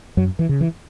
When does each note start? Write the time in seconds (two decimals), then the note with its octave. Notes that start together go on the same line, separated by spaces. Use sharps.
0.17 F#2 F#3
0.39 E3
0.49 C#3
0.61 E3